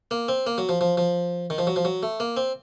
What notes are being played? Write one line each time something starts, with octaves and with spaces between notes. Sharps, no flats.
A#3
C4
A#3
F#3
F3
F3
F3
D#3
F3
F#3
F3
F#3
A3
A#3
C4